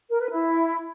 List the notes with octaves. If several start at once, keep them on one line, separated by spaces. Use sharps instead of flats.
A#4
B4
E4